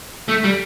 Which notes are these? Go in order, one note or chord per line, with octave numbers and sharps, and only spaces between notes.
A3
G3